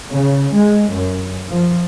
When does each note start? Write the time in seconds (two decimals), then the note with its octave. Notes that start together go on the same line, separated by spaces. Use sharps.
0.12 C#3
0.52 G#3
0.91 F#2
1.49 F3